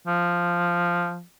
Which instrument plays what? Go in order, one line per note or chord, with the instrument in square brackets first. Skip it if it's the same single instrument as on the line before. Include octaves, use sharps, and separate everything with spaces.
[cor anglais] F3